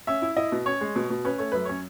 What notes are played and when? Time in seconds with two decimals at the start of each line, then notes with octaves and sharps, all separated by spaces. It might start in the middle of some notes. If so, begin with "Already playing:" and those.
0.07 C#4 E5
0.22 E4
0.36 E4 D#5
0.52 B2
0.66 C#4 C#5
0.81 G#3
0.96 B2
1.10 B2
1.25 C#4 B4
1.38 A3 C#5
1.52 F#2 B4
1.65 C#4 C#5